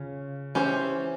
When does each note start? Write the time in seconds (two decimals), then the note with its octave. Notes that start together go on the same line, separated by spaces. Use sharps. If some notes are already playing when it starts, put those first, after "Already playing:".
Already playing: C#3 C#4 F4
0.55 E3 C#4 G4 C5